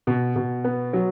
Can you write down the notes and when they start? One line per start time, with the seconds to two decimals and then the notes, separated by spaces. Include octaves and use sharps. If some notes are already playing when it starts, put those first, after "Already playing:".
0.07 B2
0.36 B2
0.64 B3
0.93 F#3